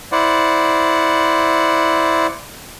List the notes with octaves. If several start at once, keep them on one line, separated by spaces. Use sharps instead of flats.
E4 C5 D5 F#5